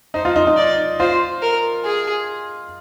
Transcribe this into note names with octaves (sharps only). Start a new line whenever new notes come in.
D#4 C5
F4
D#4
D#4
D5
F4 C5
A#4
G#4